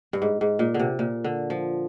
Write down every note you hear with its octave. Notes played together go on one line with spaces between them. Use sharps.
G2
G#2
G#2
A#2
D3
C3
A#2
D3
F3